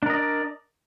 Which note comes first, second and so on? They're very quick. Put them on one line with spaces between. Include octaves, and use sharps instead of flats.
D4 A#4 D#5 D5